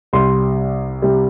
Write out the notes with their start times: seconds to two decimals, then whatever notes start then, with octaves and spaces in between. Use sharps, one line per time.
0.13 C2 C3 G3 C6
1.02 C3 G3